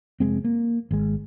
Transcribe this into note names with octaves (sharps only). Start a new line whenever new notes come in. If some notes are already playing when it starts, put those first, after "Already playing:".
F1 G#3 C4
A#3
G#1 G#3